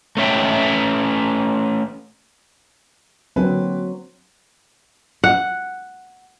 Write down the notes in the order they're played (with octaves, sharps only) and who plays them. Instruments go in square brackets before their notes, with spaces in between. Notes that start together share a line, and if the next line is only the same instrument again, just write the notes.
[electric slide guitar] A3 C#4 E5 G5
[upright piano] D3 A#3 B4 [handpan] F#3 C4
[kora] F#5